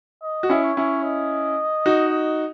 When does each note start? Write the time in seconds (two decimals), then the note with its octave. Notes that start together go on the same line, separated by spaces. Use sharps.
0.22 D#5
0.43 F#4
0.49 C#4 E4
0.63 C#5
0.77 C#4 E4
1.04 D#5
1.86 D#4 F#4